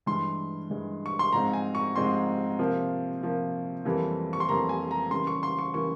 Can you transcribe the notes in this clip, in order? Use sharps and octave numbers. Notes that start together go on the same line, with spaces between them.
G2 E3 G#3 C6
G2 E3 G#3
C#6
C6
G#2 F3 G#3 C4 A#5
G#5
C#6
G#2 F3 G#3 C4 C6
C3 F3 A#3
C3 F3 A#3
F2 E3 G3 A#3
C#6
C6
F2 E3 G3 A#3 A#5
G#5
A#5
C#3 E3 G3 A#3 C6
C#6
C6
C#6
C#3 E3 G3 A#3 C#6